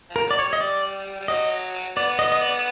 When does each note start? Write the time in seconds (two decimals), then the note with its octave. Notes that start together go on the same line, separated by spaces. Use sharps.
0.10 F3
0.16 A#4
0.27 F#3 D5
0.39 C#5
0.44 G3
0.53 D#5
0.61 D5
1.20 G3
1.28 F#3 D#5
1.96 B3 D5
2.19 D#5
2.32 D#5
2.42 D5